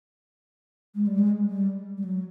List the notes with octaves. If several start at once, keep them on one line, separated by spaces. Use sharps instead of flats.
G#3
G3
G#3
G3
G3
F#3